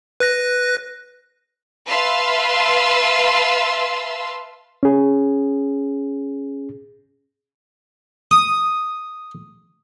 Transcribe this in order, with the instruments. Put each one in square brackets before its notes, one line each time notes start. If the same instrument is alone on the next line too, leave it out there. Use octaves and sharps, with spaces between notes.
[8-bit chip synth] B4 F#6 A#6
[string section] B4 E5 F5 A5 C6 E6
[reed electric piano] C#4 G#4
[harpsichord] D#6